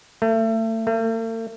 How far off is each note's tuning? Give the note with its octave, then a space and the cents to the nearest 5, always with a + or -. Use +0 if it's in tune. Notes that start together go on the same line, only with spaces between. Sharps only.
A3 +30
A3 +45